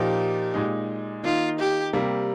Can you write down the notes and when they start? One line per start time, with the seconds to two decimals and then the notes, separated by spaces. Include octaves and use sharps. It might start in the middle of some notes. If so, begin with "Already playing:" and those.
Already playing: A#2 F3 A#3 D#4 G4
0.54 A#2 G#3 D#4
1.23 D#3 A#3 D#4 F4
1.59 G4
1.93 C3 G3 A#3